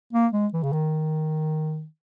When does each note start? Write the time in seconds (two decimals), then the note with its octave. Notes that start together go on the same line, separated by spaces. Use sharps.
0.13 A#3
0.33 G#3
0.53 E3
0.63 C#3
0.73 D#3